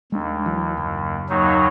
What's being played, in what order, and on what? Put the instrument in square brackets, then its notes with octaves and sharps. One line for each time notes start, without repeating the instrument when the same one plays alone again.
[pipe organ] D#2 [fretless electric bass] G#3 D4
[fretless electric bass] E3 F#3
F#1
[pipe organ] D#2 F#3 D#4